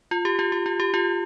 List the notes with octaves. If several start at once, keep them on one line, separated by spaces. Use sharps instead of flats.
F4
G4
F4
G4
F4
G4
F4